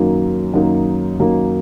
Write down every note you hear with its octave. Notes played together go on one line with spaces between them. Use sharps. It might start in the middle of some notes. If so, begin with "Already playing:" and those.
Already playing: F#2 D#3 F#3 A#3 D#4
F#2 D#3 F#3 A#3 D#4
F#2 D#3 F#3 A#3 D#4